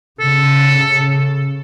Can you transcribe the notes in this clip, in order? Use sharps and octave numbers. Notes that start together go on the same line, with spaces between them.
C#3 A4